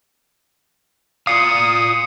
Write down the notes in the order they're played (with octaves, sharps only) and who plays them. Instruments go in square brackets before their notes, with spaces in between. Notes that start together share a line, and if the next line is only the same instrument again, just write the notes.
[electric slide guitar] F4 D5 F5 [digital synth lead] D#6 [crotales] C7 C#7